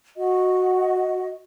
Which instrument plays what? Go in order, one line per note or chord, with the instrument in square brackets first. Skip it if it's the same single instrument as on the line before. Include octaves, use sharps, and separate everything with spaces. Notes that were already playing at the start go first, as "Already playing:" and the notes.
[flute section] F#4 D#5